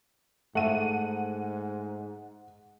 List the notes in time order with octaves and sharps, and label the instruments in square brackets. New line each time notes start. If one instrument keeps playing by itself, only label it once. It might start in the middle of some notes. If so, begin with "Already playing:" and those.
[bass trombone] G#2 [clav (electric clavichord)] A3 [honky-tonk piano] F#5 D#7